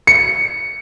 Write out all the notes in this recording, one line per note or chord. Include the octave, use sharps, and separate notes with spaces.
C#7